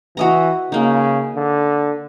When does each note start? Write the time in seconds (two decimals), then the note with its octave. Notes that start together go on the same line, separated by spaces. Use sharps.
0.17 E3 F#4 D#5 A#5
0.72 C#3 A#3 D#4
1.36 D3